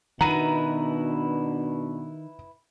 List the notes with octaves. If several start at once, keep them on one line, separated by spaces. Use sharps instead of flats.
B2 D#3 D4 E4 B4 F#5 A#5 D#7